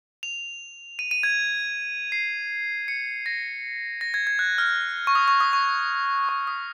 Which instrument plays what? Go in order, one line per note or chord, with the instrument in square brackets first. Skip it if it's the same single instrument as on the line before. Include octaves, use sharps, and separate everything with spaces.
[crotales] F7
D#7
D#7
G#6
C7
C#7
A#6
A#6
G#6
G#6
F#6
F6
C#6
D#6
C#6
D#6
C#6
C#6
D#6